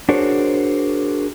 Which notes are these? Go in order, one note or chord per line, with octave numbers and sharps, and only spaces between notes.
D4 F#4 G#4 A#4 C5 C#5